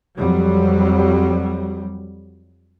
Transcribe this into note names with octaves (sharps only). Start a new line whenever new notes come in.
F2 F#3 G3